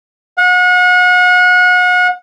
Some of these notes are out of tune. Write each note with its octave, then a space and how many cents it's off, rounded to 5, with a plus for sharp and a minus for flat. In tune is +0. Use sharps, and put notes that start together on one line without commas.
F#5 -35